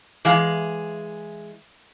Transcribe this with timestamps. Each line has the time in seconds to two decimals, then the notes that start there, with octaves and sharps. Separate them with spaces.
0.25 E3 G#3 F5